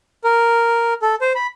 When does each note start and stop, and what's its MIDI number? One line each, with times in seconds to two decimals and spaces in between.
0.24 0.94 70
1.02 1.15 69
1.21 1.33 72
1.35 1.47 83